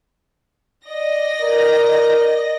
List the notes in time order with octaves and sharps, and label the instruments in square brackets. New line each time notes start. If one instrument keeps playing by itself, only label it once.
[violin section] D5 D#5 A#6
[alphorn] A#4